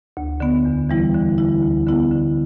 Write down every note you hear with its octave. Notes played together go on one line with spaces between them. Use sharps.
D2
D3 B3
E2
E3 G3 E4
D3
G3 E4
D2
D3 B3 E4
D3